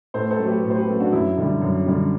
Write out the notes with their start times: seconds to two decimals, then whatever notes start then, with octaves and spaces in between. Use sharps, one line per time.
0.14 A2 A4 C5
0.31 A4 C5
0.39 F#3 A3
0.47 G4 B4
0.63 A2
0.70 C5
0.75 G4 B4
0.88 F#3 A3
1.00 D4 F#4
1.12 F#2 E4
1.37 D3 G3
1.61 F#2
1.86 D3 G3